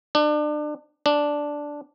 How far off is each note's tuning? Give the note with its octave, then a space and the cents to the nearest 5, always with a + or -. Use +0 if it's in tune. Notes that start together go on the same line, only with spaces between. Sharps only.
D4 +30
D4 -5